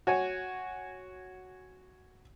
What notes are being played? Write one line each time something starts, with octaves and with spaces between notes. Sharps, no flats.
F#4 C#5 G#5